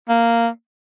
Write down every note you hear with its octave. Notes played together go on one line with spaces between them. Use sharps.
A#3